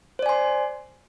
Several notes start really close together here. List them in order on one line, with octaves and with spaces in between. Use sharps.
C5 D5 G#5 C6